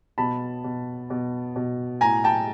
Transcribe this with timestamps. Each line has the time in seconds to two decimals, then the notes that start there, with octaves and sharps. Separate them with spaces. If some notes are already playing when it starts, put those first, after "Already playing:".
0.18 B2 A5 B5
0.64 B2
1.10 B2
1.56 B2
2.01 A2 G#5 A#5
2.24 G5 A5